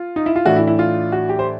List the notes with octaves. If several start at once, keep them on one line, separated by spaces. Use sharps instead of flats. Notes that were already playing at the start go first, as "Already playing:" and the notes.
Already playing: F4
D#4
E4
F4
A2 E3 A3 D4 F#4
E4
E4
F4
F#4
G4
C5